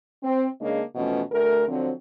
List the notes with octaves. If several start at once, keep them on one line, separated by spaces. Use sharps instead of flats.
C4
C#3 G#3 A#3 D4 D#5
B2 E3 F3 A3 C#4
D2 A3 A#4
D3 F3 F#3 C4